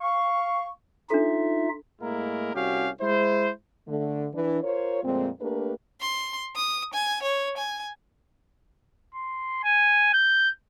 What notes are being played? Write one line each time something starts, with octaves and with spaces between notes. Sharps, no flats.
F5 C#6
D4 D#4 F4 A4 E5
A2 G#3 A#3 E4 A#4
C2 C#4 F#4 G4 F5
G#3 E4 C5
D3 A3
E3 D4
F4 A#4 C5 C#5
F2 A#2 G#3 A3 C4
A3 A#3 D4 G4 A#4 B4
C6
D#6
G#5
C#5
G#5
C6
G#5
G6